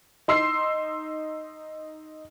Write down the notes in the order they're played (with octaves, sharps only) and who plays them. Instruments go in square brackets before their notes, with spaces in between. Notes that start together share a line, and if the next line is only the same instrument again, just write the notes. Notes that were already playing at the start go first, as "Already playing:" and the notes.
[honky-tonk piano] D#4 C6 E6 C7